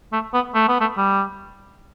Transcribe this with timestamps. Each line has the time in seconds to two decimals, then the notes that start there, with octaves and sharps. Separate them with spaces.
0.13 A3
0.34 B3
0.55 A3
0.69 B3
0.81 A3
0.98 G3